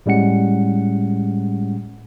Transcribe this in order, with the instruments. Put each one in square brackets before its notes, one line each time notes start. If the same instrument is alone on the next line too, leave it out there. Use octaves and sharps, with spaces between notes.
[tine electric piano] A2 G3 G#3 C#4 F#5 C#7